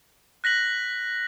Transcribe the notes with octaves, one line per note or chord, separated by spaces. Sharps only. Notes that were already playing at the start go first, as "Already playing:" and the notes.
F#6 A#6 B6 F#7